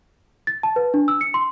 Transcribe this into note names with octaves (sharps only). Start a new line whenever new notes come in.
A6
A5
B4
D4
E6
C#7
C6